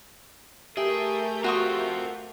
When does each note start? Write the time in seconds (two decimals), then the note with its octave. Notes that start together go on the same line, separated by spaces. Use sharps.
0.77 A3 G4 G#4 A#4 E5 G6
1.44 C4 F4 F#4 C#6 D#6